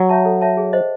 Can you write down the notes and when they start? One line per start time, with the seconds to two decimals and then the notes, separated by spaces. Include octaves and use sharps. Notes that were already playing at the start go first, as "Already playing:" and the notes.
Already playing: F#3
0.09 C#5 E5 A5
0.25 A4
0.41 C#5 E5 A5
0.57 G#4
0.73 C5 D#5 F#5